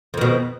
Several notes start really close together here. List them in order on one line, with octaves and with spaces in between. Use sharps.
F2 D#3 B2